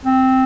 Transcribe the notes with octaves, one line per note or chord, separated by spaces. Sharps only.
C4